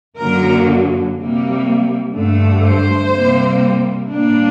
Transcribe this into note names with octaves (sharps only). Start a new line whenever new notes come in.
F#2 D3 F#3 A#3 A#4
C3 G3 A#3
G2 D3 A3
C5
C3 G3 A#3
A2 G3 A#3 D4